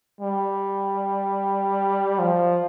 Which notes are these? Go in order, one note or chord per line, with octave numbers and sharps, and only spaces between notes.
G3
F3